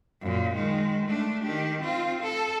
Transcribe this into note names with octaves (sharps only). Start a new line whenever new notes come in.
F#2 A#2
D#3 G#3
A3 D4
D#3 G4
C4 F4
A4